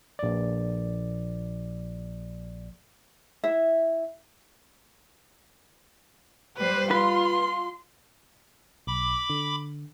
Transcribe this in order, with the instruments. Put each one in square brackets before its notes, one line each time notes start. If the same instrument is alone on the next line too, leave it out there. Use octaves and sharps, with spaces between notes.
[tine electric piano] A#1 D5
[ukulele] E4 E5
[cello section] G3 C5 [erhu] B4
[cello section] F4 [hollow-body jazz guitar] B4 [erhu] C6
[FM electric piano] B1 [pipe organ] B5 D6
[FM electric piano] D3